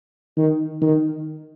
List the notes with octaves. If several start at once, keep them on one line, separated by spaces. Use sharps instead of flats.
D#3
D#3